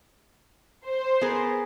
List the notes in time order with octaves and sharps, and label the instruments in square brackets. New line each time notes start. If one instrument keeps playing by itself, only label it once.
[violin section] C5
[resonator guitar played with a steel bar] B3 G#4 A#4